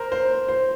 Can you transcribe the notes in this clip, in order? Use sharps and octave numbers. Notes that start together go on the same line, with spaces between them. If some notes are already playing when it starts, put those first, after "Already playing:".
Already playing: A#4 C5
C5
C5